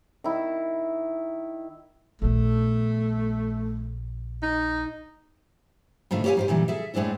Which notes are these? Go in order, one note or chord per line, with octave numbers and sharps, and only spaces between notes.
D#3 E4
A#1 A3 B3
D#4
G#2 B2 D3 A3 F4
G4 A#4 C#5 D5 F5 G#5
G#2 G4 C5
A#2 D3 E3 G3
G#4 A4 E5
A2 G#3 C4 D4 E4